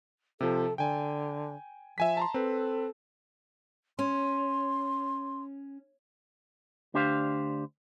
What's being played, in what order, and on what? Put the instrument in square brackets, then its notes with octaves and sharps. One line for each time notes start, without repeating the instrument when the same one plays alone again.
[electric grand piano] C3 F3 [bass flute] A4
[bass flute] D3 [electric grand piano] G5 G#5
[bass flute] F3 [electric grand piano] E5 G#5 B6
[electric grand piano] A5 A#5 C6
[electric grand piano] C4 B4 [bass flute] A4
[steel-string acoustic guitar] C#4 [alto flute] C6
[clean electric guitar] D2 D4 G4 C5 F5